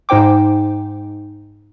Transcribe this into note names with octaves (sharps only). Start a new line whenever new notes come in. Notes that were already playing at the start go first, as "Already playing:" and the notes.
G#2 D#4 C5 G5 D6